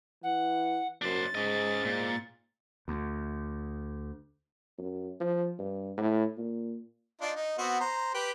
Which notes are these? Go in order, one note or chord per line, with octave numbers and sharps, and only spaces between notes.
E3 F#5
F#2 D4 C5 A6
G#2 C#4 D#5
A#2
D2
F#2
F3
G2
A2
A#2
D4 D#4 F4
D#4
B3 C4 F#4
C5 A#5
G4 B4 G5